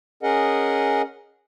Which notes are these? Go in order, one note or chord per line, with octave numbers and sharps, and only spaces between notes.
C#4 G#4 A#4 D#5 F#5